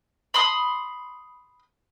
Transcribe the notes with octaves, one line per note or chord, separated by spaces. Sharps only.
B5 C6 D#6